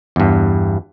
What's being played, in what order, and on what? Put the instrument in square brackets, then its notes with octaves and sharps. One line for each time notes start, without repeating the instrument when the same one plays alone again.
[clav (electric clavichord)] E2 G2